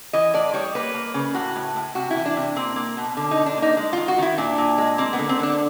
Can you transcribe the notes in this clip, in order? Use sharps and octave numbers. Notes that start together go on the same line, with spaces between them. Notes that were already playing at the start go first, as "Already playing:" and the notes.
E3 D#5
A2 D5
G3 C#5
A#3 B4
A#3
C#3
A2 F#4
A2
A2
C3 F#4
E4
E3
D4
C3
A#3 C4
A#3
B2
D3
D#4
D3
D4
A#3 D#4
G#3
D#3 F4
F#4
D#3 E4
A#2 D4
A#2
G#3
A#3 C4
B3
D3
C4
D3 D4